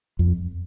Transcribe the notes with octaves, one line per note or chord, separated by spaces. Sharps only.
F2